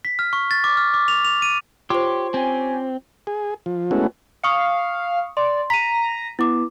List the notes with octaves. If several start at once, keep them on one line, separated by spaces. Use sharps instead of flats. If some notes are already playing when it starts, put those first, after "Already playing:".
B6
F6
C#6
A6
D6
F6
D6
F7
F7
D#7
F4 G4 C5 C#5 C6 D6
C4 C#4 G4 G#5
G#4
F3
G#3 A3 B3 C#4 E4 F#4
F5 C#6 D#6 C#7
D5 C6
A#5 B6 D#7
B3 E4 D6